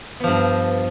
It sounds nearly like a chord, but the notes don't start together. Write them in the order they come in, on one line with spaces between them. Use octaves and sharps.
B3 F3 G2